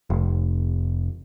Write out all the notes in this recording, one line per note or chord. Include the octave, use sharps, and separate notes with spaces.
F1